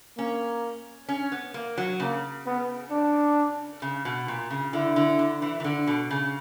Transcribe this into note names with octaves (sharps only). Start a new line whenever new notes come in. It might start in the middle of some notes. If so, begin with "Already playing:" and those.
A#3 C#4
C#4
B3
A#3
F#3
C#3 A#3
B3
D4
C#3
B2
A#2
C#3
D3 E4
D3
D3
E3
E3
D3
B2
C#3